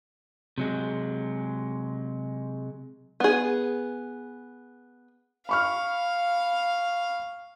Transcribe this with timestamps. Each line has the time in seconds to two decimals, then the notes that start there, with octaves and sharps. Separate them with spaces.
0.58 C3 F#3 G#3
3.20 B3 G#4
5.49 F5 B5 C#6 F6